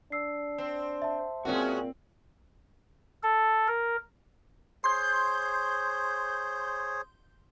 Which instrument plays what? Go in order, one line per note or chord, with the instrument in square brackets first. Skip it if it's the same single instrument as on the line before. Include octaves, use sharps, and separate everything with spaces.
[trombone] D4 [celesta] E6 C7
[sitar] C4
[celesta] E5 A5
[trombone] A#2 [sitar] G#3 C#4 F#4 [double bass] C4
[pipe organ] A4
A#4
[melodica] G#4 C5 C#5 [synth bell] C6 G6